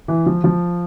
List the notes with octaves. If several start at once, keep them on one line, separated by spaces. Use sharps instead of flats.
E3
F3
F3